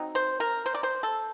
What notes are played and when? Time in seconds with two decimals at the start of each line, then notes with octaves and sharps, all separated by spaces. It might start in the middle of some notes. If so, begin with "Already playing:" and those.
Already playing: F#3 C4 D#4
0.15 C5
0.40 A#4
0.66 C5
0.74 D5
0.83 C5
1.03 A4